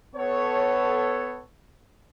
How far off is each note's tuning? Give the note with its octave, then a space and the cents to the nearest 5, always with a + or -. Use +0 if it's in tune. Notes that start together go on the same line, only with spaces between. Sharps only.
B3 +20 A4 +0 C#5 +0